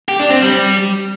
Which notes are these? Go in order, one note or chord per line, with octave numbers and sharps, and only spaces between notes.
G4
D4
C4
G3